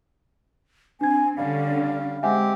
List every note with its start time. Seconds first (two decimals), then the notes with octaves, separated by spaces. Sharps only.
1.01 C4 D4 G#5 G#6
1.37 D3 G3 C#4 F5
2.23 G#3 C4 G4 E5 F#5 G#5